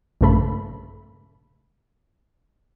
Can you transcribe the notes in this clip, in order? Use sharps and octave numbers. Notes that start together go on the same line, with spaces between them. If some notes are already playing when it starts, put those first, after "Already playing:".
A#1 G2 C#3 A3 A4 B5